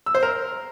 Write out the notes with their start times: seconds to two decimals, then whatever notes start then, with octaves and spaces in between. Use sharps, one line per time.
0.06 E6
0.15 C5
0.23 A#4